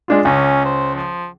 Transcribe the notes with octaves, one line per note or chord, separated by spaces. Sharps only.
G#3 D4 F4
C#2 C#4
C5
F3